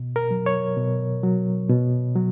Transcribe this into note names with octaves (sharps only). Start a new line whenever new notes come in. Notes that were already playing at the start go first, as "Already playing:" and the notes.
Already playing: B2
A#4
F#3
C#5
B2
F#3
B2
F#3